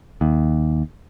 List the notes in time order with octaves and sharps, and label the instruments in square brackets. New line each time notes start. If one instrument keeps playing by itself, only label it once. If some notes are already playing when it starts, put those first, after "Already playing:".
[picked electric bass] D#2